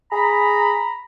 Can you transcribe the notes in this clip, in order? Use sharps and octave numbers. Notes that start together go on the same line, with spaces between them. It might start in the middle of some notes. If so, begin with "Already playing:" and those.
G#4 A#5 B5